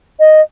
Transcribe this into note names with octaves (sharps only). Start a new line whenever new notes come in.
D#5